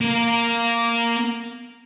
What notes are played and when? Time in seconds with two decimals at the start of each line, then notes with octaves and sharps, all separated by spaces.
0.01 A#3 A#4